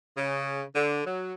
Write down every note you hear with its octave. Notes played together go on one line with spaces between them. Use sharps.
C#3
D3
F#3